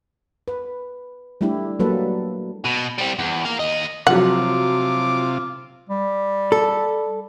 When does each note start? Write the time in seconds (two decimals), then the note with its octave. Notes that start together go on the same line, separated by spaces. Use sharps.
0.48 B4
1.41 G3 A3 D4 E4 G4
1.79 F#3 G3 A#3 A4 B4
2.65 B2
2.98 G3 C4
3.19 E2
3.45 A#4 F5
3.59 D#2 D#5
4.07 C3 F3 F#3 F4 F#5 D6
5.89 G3
6.52 A4